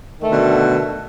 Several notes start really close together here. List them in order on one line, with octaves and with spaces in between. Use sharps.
D#3 A3 D3 B2